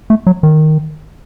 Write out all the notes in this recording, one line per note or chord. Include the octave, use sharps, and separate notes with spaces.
A3
F#3
D#3